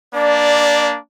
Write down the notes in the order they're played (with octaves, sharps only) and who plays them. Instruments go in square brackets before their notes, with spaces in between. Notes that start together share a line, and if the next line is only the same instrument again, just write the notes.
[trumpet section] A#3 D4 [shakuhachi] D5